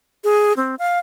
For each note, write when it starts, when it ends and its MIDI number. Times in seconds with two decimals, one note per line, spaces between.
0.24 0.53 68
0.57 0.75 60
0.79 0.99 77